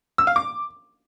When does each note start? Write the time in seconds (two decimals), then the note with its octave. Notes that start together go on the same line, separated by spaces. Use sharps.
0.18 E6
0.27 F5
0.36 D6